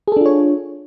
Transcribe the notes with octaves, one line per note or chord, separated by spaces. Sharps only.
D4 F4 G#4 A4 C#5